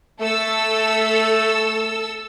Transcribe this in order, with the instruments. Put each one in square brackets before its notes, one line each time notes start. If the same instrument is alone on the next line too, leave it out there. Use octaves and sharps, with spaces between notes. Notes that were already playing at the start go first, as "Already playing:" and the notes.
[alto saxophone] A3 [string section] A4 E6